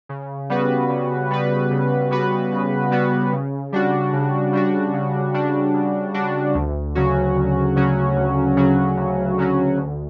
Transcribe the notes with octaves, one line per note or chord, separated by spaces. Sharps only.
C#3
G3 B3 F#4 B4
C#3
G3 B3 F#4 B4
C#3
G3 B3 F#4 B4
C#3
G3 B3 F#4 B4
C#3
G3 D4 F#4
C#3
G3 D4 F#4
C#3
G3 D4 F#4
C#3
G3 D4 F#4
D2
C#3 F#3 C#4 F#4
D2
C#3 F#3 C#4 F#4
D2
C#3 F#3 C#4 F#4
D2
C#3 F#3 C#4 F#4
D2